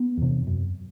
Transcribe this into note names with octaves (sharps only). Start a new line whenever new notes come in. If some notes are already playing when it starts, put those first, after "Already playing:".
Already playing: B3
E2 C3
F#2